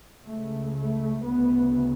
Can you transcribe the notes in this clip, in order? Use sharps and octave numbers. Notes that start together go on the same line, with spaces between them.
C#2 C#3 A3
A3
D2 C#3 B3